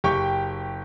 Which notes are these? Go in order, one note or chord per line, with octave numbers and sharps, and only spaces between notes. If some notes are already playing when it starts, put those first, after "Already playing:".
F#1 G4 G5 C#6 G6